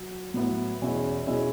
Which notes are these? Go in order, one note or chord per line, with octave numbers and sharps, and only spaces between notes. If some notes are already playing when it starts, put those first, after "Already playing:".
Already playing: F#3
A2 F#3 B3 E4
E2 B2 G#3 C#4 E4
B2 G#3 C#4 E4